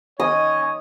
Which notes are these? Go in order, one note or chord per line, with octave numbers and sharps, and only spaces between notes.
D#3 A#3 C#4 D#4 C#5 D#5 D#6